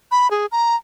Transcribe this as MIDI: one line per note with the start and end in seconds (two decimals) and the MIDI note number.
0.11 0.30 83
0.31 0.46 68
0.52 0.76 82